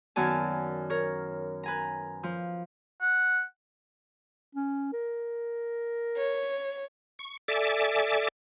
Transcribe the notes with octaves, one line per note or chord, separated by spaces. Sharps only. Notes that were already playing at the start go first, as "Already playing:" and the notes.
F#2 D#3 B3 D5 G#5 A5
A#4 C#5
B4 G#5 A#5
F3
F#5
C#4
A#4
C#5
C#6
A4 D5 E5 G#5 D6